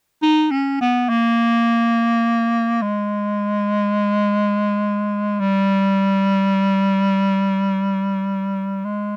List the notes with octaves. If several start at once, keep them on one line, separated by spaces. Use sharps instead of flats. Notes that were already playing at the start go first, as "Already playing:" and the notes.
D#4
C#4
B3
A#3
G#3
G3
G#3